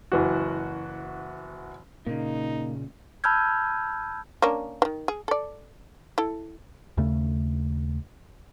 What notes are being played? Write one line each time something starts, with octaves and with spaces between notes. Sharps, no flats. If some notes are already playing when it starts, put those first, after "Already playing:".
F#1 E3 F#4
A#2 C#3 A#3 D#4
A5 B5 E6 F6 G6 G#6
A#3 C#4 D4
D#3 E3
G#4
A4 D5
E4 A4
D#2 C#3 A3